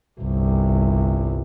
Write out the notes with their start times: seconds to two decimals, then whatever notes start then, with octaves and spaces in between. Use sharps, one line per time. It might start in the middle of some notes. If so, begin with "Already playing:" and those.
0.20 G1 C2